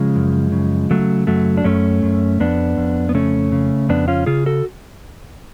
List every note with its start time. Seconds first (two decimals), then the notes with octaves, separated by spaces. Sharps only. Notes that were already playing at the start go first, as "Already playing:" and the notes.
Already playing: C#3 F3 G#3
0.16 F#2
0.52 C#3
0.91 C#3 F#3 A3
1.27 F#2 F#3 A3
1.57 D4
1.64 F#2 A3 C#4
2.03 F#2
2.40 F2 B3 D4
2.77 F2
3.09 B3
3.15 C#3 A3 C#4
3.52 C#3
3.89 F2 B3 D4
4.08 C#4 F4
4.26 C#3 F4 G#4
4.46 F#4 A4